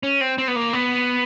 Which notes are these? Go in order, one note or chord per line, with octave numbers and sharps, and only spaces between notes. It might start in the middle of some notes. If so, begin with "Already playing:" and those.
C#4
C4
C4
B3
A#3
B3